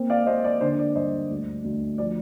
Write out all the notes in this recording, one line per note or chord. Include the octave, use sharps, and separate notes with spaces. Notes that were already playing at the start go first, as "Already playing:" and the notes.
Already playing: A#3 C4
D5 F5
A#3 C5 D#5
D5
D3 C5
D5
G2 C5 D#5
D2
D2
F3 D5